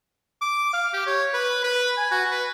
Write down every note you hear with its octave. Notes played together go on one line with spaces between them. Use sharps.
D6
F5
G4
C#5
B4
B4
G#5
F#4
B4